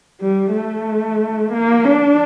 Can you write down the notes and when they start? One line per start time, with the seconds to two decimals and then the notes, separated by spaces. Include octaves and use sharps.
0.21 G3
0.53 A3
1.52 A#3
1.85 D4